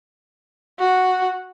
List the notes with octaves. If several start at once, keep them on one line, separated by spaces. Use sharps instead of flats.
F#4